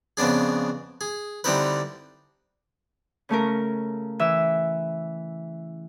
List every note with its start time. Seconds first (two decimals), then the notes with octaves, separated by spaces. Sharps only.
0.17 F2 C#3 B3 D4 G#4
1.01 G#4
1.44 D3 G3 C4 D#4 E4 B4
3.29 C#3 A3 C#4 A#4
4.19 E3 E5 E6